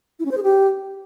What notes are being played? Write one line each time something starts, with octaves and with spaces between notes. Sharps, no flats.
E4
C#4
C5
G#4
G4